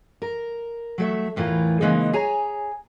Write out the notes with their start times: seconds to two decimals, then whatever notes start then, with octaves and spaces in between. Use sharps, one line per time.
0.22 A#4
0.98 F#3 A3 E5
1.36 E2 A2 E3 F4 A#4
1.81 C#3 E3 G#3 A#3 C4 D#4
2.13 G#4 C#5 G#5 A#5